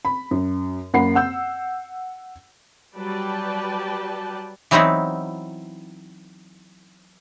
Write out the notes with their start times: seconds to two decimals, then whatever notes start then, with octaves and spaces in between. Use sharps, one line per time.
0.05 B5
0.31 F#2
0.94 F#2 A#3 F#5 B5 C7
1.15 F#5 E6 G6
2.97 F#3 G3 B4 D5 G5 A5
4.71 E3 F#3 B3 C4 D#4 E4